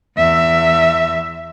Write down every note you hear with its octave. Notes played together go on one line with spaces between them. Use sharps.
E2 E5